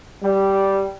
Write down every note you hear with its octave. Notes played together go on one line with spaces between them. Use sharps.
G3